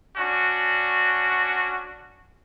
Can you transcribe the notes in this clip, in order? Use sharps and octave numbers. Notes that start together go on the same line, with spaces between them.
C#4 D4 F#4